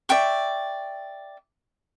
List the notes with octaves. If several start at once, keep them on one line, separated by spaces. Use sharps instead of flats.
D5 E5 G5 C#6